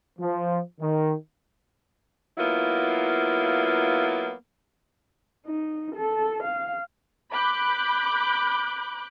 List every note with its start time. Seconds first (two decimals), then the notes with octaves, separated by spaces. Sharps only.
0.19 F3
0.81 D#3
2.38 F#3 A#3 B3 E4 F4
5.46 D#4
5.95 A4
6.43 F5
7.31 B5 D6 F#6 G6